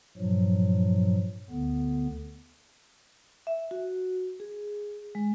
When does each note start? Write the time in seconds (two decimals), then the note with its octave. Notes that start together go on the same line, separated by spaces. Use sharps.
0.17 G2 A#2 F3 F#3
1.50 D2 D3 B3
3.47 E5
3.71 F#4
4.40 G#4
5.15 G#3